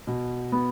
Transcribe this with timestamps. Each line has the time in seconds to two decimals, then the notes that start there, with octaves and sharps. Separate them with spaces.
0.07 B2
0.52 B3